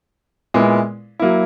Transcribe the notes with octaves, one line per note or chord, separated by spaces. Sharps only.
A#2 G#3 B3 E4
F#3 A#3 E4